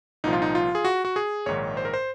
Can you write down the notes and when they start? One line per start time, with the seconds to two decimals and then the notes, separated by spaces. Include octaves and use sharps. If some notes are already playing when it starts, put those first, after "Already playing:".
0.24 C2 A#2 F3 D#4
0.33 F4
0.42 D#4
0.55 F4
0.75 G#4
0.85 F#4
1.05 F#4
1.16 G#4
1.46 A#1 G#2 D#3 C#5
1.77 C5
1.85 A#4
1.94 C5